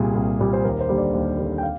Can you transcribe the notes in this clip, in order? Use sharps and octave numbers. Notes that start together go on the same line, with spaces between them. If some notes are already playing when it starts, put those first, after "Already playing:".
Already playing: C2 A#2 G3 G#4
C2
A#2 G3
C5
D#2 A#4
C5
D3 G3 A#3
D5
D#2
D3 G3 A#3
G5
F5